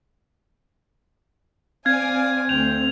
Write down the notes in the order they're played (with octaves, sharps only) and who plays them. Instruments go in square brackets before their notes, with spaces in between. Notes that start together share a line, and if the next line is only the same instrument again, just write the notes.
[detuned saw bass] C4 [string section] D5 G#5 [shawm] F5 [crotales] G#6
[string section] D2 [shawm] G5 [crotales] F7